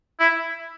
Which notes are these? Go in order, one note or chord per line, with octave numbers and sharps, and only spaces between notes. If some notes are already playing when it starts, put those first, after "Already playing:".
E4